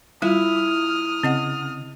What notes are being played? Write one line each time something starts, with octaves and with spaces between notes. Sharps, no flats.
G3 E4 F4 D#6 F6
C#3 C4 D#5 F#5